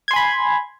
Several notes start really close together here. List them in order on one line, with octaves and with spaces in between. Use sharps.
G#6 C6 G#5 B5